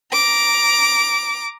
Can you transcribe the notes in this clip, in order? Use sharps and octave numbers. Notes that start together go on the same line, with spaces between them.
A#5 D6